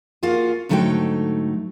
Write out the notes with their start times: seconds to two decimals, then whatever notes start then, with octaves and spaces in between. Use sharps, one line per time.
0.23 A#3 F4 F#4 G#4
0.69 G#2 D3 F#3 A3 D#4 G5